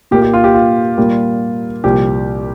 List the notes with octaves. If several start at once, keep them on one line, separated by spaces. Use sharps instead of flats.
A#2 A#3 G4
G4
F4
G4
F4
A#2 G3 A#3
C2 A#2 F3 A#3 G4